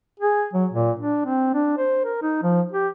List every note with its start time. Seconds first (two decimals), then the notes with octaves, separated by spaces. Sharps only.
0.20 G#4
0.54 F#3
0.72 A#2
0.99 D4
1.26 C4
1.54 D4
1.78 C5
2.05 A#4
2.22 D#4
2.43 F3
2.72 G4